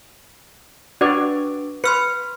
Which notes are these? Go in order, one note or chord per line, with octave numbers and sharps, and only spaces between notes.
D4 F#4 B4 D5
B4 C6 F6 C#7